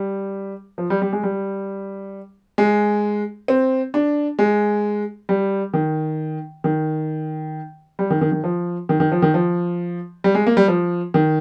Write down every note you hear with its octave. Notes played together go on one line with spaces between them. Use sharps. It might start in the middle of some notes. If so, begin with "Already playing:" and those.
Already playing: G3
F3
G3
G3
G#3
G3
G#3
C4
D4
G#3
G3
D#3
D#3
G3
D#3
D#3
D#3
F3
D#3
D#3
F3
D#3
F3
G3
G#3
A#3
G3
F3
D#3